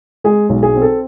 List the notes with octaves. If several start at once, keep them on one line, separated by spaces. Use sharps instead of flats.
G#3 G#4
B1
G#4
C4
A4